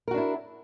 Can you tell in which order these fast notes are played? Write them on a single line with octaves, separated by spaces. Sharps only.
A#4 F#4 D4 E4